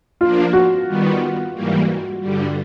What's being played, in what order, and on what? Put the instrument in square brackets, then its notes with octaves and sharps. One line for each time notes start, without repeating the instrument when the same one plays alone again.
[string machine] F3 A#3 D4 [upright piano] F4
[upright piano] F#4
[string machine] D#3 G3 B3
G#2 E3 G3 A#3
G2 D3 G3